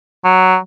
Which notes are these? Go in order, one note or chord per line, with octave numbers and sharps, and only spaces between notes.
F#3